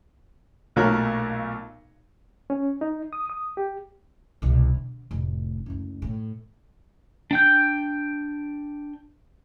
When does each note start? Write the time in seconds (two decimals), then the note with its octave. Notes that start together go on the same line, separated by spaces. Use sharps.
0.76 B1 A#2 A3 F#4 A#4 C#5
2.50 C#4
2.81 D#4
3.13 D#6
3.30 D#6
3.57 G4
4.42 C2 B2
4.74 D3
5.11 F1 A2
5.66 F#1 D2
6.02 A2
7.31 D4 G5 G6